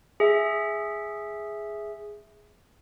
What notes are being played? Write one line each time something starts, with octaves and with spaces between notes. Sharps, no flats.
G#4 E5